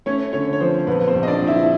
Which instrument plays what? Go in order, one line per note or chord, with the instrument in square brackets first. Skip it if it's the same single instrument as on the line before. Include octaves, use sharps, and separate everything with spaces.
[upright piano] A3 C#4 C#5
D3 C#4 C#5
C#5
F3 C4 C5
A#1 B3 B4
C4 C5
A#1
D#5
D4 D5
A#1
E4 E5